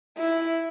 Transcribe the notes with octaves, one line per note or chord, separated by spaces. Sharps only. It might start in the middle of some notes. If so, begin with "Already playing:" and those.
E4